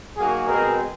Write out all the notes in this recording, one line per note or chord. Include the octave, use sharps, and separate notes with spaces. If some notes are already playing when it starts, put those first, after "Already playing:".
F#3 A#3 D#4 F#4 G#4
B2 G#3 C4 G#4 A#4